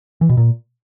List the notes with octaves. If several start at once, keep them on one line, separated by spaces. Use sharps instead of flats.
E3
B2
A#2